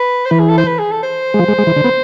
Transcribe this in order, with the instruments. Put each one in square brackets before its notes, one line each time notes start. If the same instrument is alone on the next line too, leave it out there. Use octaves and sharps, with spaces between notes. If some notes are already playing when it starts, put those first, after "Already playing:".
Already playing: [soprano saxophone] B4
C5
[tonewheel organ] E3 [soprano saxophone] B4
[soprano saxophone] G#4
A4
C5
B4
G#4
A4
C5
[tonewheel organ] G#3
F3
G#3
G#3
E3
D3
B3